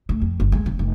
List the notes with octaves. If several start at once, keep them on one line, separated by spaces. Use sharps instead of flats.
A2
F2
G1
G#3
E1
F1